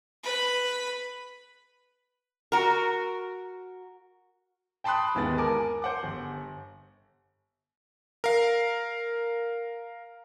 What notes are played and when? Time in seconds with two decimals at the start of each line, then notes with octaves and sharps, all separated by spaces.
0.24 B4 B5
2.52 F#4 A#4
4.84 G5 A5 B5 C6 D#6 F#6
5.15 G1 D#2 E3 G#3 B3 A6
5.38 A#4 G#5 A5 D6
5.82 C5 F#5 D6
6.03 G1
8.24 A#4 F5